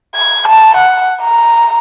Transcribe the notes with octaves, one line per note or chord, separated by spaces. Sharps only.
G#6
A5
F#5
A#5